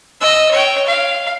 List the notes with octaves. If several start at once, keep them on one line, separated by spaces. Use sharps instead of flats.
D#5 E6
C#5 G5
F5